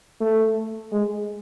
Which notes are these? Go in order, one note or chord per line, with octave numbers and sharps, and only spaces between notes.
A3
G#3